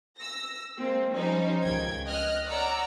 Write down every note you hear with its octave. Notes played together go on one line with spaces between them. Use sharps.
E6 A#6
G#3 A#3 C4
F3 G3 C#4 D#4 C5
C#2 D#3 G5 G#6
D#5 F6 F#6
C#5 D5 F#5 A#5 E6 F6